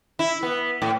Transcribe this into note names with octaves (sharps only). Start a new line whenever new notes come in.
E4
B3
A2